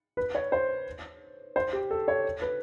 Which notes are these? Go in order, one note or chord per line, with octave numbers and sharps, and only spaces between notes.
B4
C#5
C5
C5
G4
A4
C#5
B4